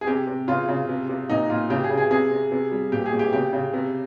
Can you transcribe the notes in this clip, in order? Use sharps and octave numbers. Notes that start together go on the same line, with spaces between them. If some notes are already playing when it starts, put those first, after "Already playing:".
G#4
C3 G4
C3
C#3 F4
C#3
C3
C3
A#2 D#4
A#2 F4
C#3 G4
G#4
C#3
G#4
C3 G#4
C3
C3
G3
A#2 G4
G#4
A#2
G4
C#3 G4
C#3
C3